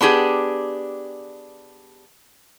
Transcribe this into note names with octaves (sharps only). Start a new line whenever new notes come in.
B3 D4 G4 G#4